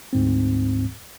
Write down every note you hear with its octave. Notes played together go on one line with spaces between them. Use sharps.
D2 G#2 C4